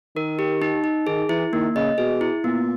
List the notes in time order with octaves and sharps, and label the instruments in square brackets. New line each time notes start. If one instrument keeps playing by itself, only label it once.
[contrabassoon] D#3 [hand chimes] A#4
[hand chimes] G4
D#4
D#4
[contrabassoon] D#3 [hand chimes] G#4
[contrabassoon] E3 [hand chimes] E4
[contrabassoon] D#3 [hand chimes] A#3
[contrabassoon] C#3 [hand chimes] D#5
[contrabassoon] B2 [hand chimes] G#4
[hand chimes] E4
[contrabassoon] A#2 [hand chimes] B3